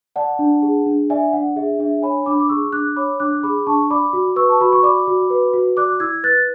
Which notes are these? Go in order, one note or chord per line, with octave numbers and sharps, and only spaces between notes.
D5 F#5 A5
D4
G#4
D4
D5 E5 G#5
D4 F#5
G#4 E5
D4 E5
C#5 G#5 B5
D4 B5 D6
D6
G#4 C#6 E6
D4 D6 F#6
C#5 B5 D6
D4 D6 F#6
G#4 B5 D6
D4 A5 C#6
D5 B5 D6
F#4
B4 C#6 E6
A5
F#4 B5
C#6
D5 B5 D6
F#4
B4
F#4
D5 D6 F#6
E4 E6 G#6
B4 F#6 A6